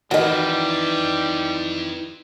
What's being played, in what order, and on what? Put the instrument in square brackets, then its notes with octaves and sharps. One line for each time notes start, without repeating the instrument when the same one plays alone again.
[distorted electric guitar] F2 [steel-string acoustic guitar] D#3 E3 [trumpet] G3 [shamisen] F#4 D#5